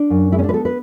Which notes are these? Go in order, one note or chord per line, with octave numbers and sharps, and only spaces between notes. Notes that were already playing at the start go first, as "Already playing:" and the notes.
Already playing: D4
F#2
G#3 E4
C#4
D4
B4
B3 A4
B4